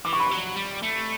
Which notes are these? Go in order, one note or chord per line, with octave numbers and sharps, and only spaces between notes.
E3 D6
C#6
B5
F#3 C#6
G3
A3